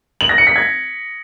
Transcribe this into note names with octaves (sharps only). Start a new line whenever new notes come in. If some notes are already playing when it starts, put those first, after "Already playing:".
F#7
A#6
C#7
B6
G#6